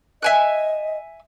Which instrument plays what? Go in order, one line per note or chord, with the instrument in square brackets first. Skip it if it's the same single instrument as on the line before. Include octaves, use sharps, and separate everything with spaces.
[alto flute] D#5 [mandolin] E5 G#5 F#6